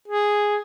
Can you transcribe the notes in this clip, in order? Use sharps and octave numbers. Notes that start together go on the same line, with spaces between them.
G#4